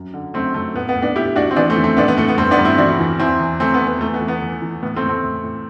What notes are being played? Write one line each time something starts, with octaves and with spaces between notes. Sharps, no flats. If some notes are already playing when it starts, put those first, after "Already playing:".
Already playing: F#2
D3
F#2 A3 C4
F#2 A3
A2 B3
B3
A2
B3 D4
A2 E4 G4
A2 D4 F#4
C4
E3 B3 D4
A3 C4
E3
A3 C4
A2 B3 D4
B3
A2 A3
B3
G2 A3 C4
B3 D4
G2
C4 E4
E3 D4 F#4
E3
E2 C4 E4
E2
E3 A3 C4
B3
E2
B3
E3 A3
B3
E3
B3
E3
E3
A2 B3
A3 C4
A2
A3 C4
A2
A2